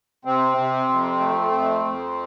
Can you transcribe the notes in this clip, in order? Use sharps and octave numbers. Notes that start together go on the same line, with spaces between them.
C3 C4
C3
F2
A3
F2
F2